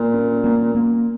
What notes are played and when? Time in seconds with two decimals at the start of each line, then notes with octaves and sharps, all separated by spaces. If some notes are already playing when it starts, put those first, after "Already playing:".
Already playing: A#2 A#3
0.14 C#4
0.44 A#3
0.75 A#3